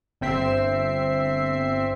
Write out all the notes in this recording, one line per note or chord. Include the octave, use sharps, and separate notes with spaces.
G1 C4 E5 C7